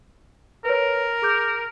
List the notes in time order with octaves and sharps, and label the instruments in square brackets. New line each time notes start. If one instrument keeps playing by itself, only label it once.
[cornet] A#4 [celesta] B4 C#5
[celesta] G#4 D6 G6